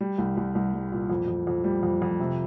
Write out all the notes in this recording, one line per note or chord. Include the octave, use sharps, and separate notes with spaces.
G3
C2
C2
C2
G3
A#2
F2
F2
F2
G3
F2
F2
C3